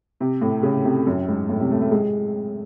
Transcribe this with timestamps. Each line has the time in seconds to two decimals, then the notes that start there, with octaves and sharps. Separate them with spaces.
0.20 C3
0.41 A2
0.63 C#3
0.85 C3
1.06 F#2
1.28 G#2
1.49 A2
1.60 C3
1.71 A3
1.81 A3
1.91 G#3